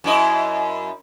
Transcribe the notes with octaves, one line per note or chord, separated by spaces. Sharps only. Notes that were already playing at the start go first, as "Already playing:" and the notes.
F#2 E4 D#5